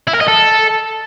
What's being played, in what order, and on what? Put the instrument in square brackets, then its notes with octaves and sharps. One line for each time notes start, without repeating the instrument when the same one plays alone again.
[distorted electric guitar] E4
A#4
D#5
A4